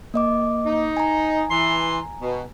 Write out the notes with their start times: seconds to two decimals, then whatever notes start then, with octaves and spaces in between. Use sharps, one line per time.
0.14 A#3 D#5 D6
0.65 D#4
0.97 G#5 A#5
1.50 E3 C6
2.22 B2